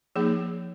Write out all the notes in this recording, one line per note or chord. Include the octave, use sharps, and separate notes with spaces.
F3 A#3 D#4 G#4